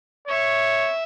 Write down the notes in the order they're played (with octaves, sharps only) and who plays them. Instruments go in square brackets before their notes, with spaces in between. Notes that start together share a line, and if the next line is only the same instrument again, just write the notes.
[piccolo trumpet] C#5 [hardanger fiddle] E5